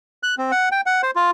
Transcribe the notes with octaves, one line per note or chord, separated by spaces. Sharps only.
F#6
C4
F#5
G5
F#5
C5
F4